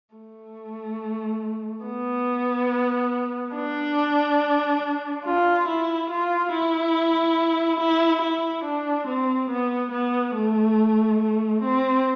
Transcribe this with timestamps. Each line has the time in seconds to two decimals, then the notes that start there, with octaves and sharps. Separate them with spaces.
0.15 A3
1.85 B3
3.55 D4
5.25 F4
5.67 E4
6.10 F4
6.52 E4
7.80 E4
8.22 E4
8.64 D4
9.07 C4
9.50 B3
9.92 B3
10.35 A3
11.19 A3
11.62 C4